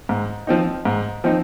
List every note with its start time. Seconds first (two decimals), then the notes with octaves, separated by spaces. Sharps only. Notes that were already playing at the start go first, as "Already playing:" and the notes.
0.09 G#2
0.47 F3 C4 D#4
0.85 G#2
1.24 F3 C4 D#4